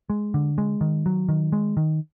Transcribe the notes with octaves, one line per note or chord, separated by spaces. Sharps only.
G#3
D3
G#3
D#3
F#3
D#3
G#3
D#3